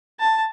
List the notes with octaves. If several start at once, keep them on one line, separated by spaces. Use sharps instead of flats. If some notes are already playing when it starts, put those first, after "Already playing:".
A5